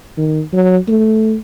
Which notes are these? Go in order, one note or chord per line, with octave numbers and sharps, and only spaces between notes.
D#3
F#3
A3